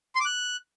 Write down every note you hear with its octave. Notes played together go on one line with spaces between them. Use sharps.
C6
D6
F#6